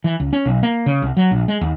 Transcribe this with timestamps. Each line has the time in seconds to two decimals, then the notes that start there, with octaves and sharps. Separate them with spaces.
0.04 E3
0.20 C#2
0.33 C#4
0.46 B1
0.63 A#3
0.86 C#3
1.02 C2
1.17 F#3
1.31 A#1
1.48 G#3
1.61 D#2